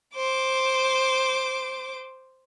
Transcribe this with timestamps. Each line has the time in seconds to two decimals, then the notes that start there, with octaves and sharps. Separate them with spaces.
0.15 C5 D6